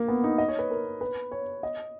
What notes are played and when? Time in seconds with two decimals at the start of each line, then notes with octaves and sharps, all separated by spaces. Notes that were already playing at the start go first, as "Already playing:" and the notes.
Already playing: A#3
0.08 B3
0.24 D#4
0.38 D#5
0.48 C#5
0.59 B4
0.71 A#4
1.01 B4
1.32 C#5
1.63 D#5